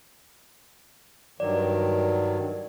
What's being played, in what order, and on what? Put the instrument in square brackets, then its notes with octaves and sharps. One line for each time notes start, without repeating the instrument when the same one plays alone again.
[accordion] G2 D#3 F#3 [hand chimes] D5